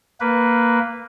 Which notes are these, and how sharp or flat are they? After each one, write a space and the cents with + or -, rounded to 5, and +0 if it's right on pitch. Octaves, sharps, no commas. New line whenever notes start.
A#3 -5 B4 +0